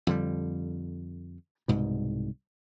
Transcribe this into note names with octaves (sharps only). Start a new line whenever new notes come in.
F2 D3 G3
C2 G#2 B2